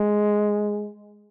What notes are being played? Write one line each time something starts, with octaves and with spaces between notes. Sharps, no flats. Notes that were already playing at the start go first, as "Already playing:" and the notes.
Already playing: G#3